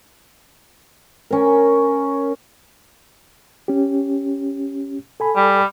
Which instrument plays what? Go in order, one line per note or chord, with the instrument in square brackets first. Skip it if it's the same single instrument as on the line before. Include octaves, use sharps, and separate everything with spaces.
[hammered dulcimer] C#4 A#4
[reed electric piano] C#4 G4
A4 G#5 B5
[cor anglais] G3